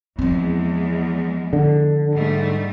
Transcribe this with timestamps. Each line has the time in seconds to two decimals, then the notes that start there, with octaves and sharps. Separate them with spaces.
0.19 E2 F3 G#3 C4
1.53 D3
2.13 G#2 G3 A3